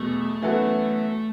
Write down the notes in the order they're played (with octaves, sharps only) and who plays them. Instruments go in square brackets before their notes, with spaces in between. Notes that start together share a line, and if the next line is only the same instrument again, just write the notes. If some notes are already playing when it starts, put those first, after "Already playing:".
Already playing: [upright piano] E2 B2 F#3 [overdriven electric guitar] A3
[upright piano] F#2 E3 B3 F#4 A4